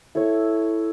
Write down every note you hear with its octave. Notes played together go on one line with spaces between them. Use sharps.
E4 A4 C#5